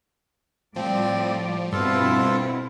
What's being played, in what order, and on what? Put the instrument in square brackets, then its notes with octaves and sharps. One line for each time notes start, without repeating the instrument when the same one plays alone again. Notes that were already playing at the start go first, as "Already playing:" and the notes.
[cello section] A2 G3 D5 [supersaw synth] F3 [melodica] C4
[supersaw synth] G2 [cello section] B2 C4 E4 [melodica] F4 A4